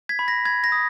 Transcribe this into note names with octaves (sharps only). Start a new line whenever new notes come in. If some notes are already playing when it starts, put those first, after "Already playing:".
G#6 B6
B5
A#6
B5 G#6
A#6
D#6